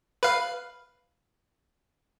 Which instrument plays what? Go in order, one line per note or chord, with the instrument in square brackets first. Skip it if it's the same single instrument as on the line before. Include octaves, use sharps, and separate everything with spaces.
[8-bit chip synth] B4 F5